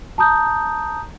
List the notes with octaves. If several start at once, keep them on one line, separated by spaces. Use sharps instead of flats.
A5 A#5 D#6 G6